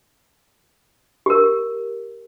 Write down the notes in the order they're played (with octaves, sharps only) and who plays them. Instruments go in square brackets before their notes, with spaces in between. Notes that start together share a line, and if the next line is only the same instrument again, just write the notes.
[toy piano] G4 A#4